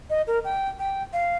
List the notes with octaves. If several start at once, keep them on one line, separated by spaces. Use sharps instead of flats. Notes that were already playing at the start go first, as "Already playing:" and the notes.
D#5
A#4
G5
G5
F5